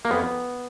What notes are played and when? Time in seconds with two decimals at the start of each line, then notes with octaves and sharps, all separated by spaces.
0.05 A#3
0.10 F2 B3